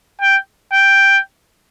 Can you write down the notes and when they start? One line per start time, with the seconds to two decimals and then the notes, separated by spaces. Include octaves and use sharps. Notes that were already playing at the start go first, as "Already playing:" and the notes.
0.21 G5
0.73 G5